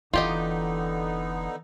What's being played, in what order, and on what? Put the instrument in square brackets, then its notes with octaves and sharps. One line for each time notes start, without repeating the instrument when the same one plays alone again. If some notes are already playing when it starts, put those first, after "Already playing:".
[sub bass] F1 [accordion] D3 B3 D#4 [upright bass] E3 [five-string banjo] F4 G4 D#5